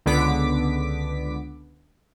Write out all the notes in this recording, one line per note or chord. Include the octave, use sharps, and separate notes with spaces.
C#2 D3 B3 D6 B6